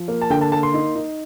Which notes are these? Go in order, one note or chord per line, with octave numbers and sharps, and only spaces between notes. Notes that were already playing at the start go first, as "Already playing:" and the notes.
Already playing: F3
A#3
A5
D3 G5
A5
A#3 A5
C6
D#4
D#4